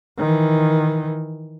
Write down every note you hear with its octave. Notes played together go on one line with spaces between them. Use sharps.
D#3 E3